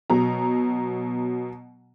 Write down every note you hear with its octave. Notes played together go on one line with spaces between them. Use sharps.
B2 F#3 A#5